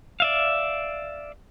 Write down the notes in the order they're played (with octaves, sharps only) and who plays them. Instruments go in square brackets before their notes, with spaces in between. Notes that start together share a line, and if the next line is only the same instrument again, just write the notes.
[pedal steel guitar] D5 E5 F5